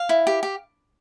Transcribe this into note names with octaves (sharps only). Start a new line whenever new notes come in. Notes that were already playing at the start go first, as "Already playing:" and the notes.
Already playing: F5
E4
G4
G4